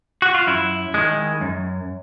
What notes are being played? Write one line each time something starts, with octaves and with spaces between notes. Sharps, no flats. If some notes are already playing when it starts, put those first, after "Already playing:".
F#4
F4
F#2 E4
D#3 G#3
F#2